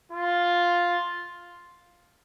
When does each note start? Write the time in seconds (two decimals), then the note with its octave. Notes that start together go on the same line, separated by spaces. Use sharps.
0.12 F4